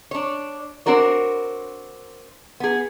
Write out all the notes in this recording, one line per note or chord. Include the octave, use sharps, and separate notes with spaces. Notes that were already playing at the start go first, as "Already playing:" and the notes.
D4 C#5
C4 D4 F#4 A#4 C#5
B3 G#4